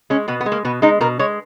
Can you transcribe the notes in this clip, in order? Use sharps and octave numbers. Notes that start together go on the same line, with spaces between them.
G#3 C#4
B2 B3
B3
G#3
A#3
B2 B3
G#3 D#4
B2 A#4
G#3 C#5